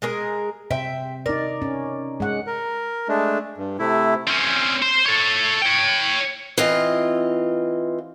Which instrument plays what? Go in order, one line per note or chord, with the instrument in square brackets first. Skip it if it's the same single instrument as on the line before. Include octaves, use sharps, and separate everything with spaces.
[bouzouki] G#3 G#4 A#4
[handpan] C3 C5 [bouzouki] E5 G5
[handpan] D#4 D5 [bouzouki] A#4
[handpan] C#4
G#3 F#5
[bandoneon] A#4
G#3 A3 D4
G2
C3 A3 E4
[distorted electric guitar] C4 C#4
C5
A4 C#5
C#5 G5
[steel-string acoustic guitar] E3 C4 F4 D#5